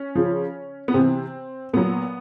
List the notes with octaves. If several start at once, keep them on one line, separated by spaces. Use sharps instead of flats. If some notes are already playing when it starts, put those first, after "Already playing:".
Already playing: C#4
C#3 F3
B3
C3 E3 C4
A#2 F#3 B3